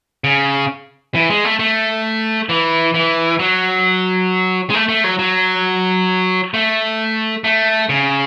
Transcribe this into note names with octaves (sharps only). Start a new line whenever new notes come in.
C#3
E3
G#3
A3
A3
E3
E3
F#3
G#3
A3
A3
F#3
F#3
A3
A3
C#3